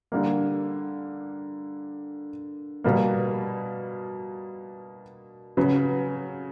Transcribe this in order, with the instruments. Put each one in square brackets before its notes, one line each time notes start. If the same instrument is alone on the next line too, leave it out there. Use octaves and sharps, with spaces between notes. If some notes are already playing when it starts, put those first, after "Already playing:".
[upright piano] D3 G3 A#3
B2 G3 A#3
C#3 F#3 B3